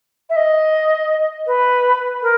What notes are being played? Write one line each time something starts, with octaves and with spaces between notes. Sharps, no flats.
E5
D#5
B4
A#4